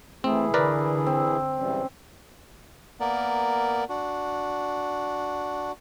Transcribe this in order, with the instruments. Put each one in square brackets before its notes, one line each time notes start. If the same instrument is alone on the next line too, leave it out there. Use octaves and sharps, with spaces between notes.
[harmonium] E3 E4 G#4 [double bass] A3 [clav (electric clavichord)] C4
[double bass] D3 [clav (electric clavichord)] A#4 B4 D5
[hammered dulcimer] C4
[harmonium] G#2 E3 G3 [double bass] C#4
[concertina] A#3 B3 A#4 D5
D4 F#4